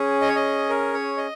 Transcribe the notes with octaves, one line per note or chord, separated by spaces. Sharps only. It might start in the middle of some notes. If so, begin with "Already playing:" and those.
Already playing: C#4 G#4
D#5
C#5
D#5
A#4
C#5
D#5